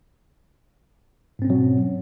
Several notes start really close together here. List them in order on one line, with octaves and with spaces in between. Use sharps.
G#2 C4 C#4 B2 F#3